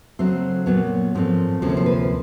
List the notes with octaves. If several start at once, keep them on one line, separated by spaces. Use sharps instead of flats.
C#3 F#3 A3 C4 C5
A#2 F#3 B3 C#5
G#2 F3 A3 C4
D2 C3 F3 A#3 C#4 C5
C#5
C5
B4